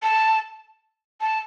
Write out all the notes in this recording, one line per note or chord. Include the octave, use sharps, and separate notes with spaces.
A5
A5